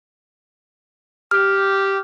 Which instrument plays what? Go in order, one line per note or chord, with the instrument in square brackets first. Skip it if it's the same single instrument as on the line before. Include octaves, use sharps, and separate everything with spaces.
[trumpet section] G4 [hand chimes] F6